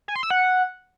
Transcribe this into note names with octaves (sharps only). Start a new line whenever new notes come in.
G#5
C6
E6
F#5